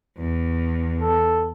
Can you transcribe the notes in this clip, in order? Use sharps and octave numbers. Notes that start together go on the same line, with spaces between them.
E2
A4